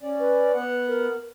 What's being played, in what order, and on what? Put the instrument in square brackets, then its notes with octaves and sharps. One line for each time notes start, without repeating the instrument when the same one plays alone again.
[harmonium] C#4 D5
[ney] B4
[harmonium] B3 F#5
[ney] A#4